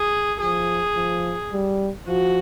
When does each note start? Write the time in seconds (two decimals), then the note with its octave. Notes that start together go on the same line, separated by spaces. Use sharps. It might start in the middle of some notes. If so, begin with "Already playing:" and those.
Already playing: G#4
0.41 F3 G#4
0.96 F3
1.52 G3
2.07 F3 F#4